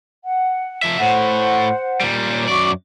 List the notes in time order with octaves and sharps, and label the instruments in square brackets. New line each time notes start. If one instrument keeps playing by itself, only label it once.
[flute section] F#5
[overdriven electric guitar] F3 E5
[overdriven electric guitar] A2 [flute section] C5 F#5
[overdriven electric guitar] A#2 G3
[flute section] C#5 D6
[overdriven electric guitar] F#2 D5 [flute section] F#4 C#6 D6